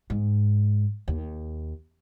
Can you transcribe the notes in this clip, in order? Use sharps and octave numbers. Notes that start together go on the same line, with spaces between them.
G#2
D#2